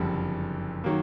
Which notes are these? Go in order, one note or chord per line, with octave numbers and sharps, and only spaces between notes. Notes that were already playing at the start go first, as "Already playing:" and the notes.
Already playing: F#1 F2 D3 G3
D#3 F#3 A#3